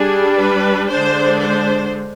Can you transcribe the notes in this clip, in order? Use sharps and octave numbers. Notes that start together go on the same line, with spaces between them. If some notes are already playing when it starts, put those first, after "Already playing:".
Already playing: G3 D4 G#4
B4
D3 G#3 D4 C5
C5